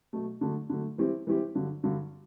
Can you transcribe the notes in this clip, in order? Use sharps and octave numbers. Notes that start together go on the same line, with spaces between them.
B2 F#3 A3
D3 F#3 A3
D3 F#3 A3
E3 G3 C4 E4 G4
E3 G3 C4 E4 G4
G2 D3 F#3
G2 D3 F#3